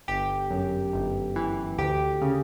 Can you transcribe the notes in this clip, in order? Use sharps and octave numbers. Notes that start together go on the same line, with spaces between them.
G1 G4
F#2
G1
E3
D2 G4
C#3